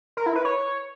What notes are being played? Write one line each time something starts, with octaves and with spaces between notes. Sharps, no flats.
A#4
E4
B4
C#5